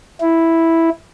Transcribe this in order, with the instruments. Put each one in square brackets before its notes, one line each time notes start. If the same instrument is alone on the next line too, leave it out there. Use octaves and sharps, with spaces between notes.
[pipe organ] E4